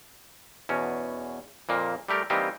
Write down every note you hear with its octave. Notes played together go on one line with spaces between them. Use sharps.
E2 B2 C#4
F2 A#2 A#3
G3 A3 G4 A#4
E3 G3 A#3 C4 D#4 G4